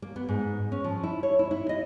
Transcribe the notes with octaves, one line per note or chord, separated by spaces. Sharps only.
A#3
B3
G#2
C#4
F3
E4
C#5
E4
E4
D#5